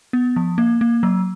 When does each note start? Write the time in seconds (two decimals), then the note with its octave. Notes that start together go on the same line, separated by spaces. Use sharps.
0.13 B3
0.36 F3
0.58 A#3
0.81 A#3
1.03 F#3